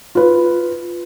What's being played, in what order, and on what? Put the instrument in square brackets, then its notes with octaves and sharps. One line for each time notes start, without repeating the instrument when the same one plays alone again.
[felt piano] F4 B4